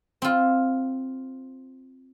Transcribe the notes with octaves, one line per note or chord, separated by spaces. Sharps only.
C4 F4